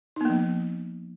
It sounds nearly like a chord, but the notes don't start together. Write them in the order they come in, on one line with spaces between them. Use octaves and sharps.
D#4 B3 A#3 F3